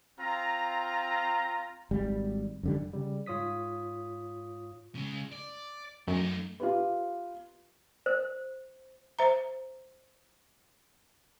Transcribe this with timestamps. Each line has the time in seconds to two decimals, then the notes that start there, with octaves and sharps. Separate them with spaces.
0.19 C4 F4 A#5
1.91 G#1 G3
2.63 F#2 D3 G3
2.93 C#3 G3
3.26 G#2 F4 C#5 D#6 B6
4.95 C#3 G#3
5.33 D5
6.08 F#2 A3 D#4
6.60 F4 G4 B4
8.06 C5
9.19 C5 E5 A#5